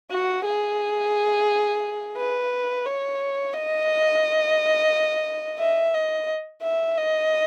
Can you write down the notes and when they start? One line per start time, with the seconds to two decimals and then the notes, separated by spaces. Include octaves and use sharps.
0.11 F#4
0.45 G#4
2.17 B4
2.85 C#5
3.54 D#5
5.59 E5
5.94 D#5
6.63 E5
6.98 D#5